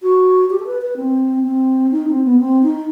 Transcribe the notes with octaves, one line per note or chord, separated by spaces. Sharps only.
F#4
G4
A4
B4
B4
C4
C4
D#4
C4
B3
C4
D#4